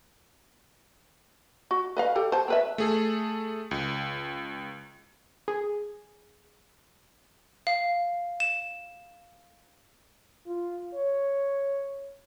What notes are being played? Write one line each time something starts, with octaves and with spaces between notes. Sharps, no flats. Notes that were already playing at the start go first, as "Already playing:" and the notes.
F#4
B4 D#5 F5
G4 A4
C5 A5
C4 B4 E5
A3 G#4 A4
C#2
G#4
F5
E7
F4
C#5